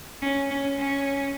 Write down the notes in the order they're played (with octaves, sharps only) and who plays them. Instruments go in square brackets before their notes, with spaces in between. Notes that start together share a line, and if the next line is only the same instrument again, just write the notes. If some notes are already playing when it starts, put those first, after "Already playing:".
[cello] C#4
C#4
C#4